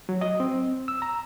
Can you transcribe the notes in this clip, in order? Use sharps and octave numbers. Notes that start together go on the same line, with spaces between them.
F#3
D#5
C4
E6
A#5